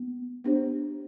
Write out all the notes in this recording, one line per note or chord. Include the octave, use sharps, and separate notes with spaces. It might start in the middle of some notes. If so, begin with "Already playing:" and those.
Already playing: B3
B3 D4 G4 C5